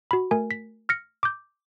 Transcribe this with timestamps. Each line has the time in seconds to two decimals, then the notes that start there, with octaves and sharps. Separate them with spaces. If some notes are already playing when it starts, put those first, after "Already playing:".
0.11 F#4 B5
0.31 A3 A#4 G#5
0.51 B6
0.89 F6 A#6 C#7
1.23 D6 G6